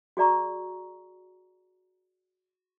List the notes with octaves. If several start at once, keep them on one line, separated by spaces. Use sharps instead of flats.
F#4 G#4 D5 A#5 C#6